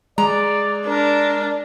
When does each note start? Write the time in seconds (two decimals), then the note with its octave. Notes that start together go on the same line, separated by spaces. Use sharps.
0.18 G#3 D5 A#5
0.87 D4 A#4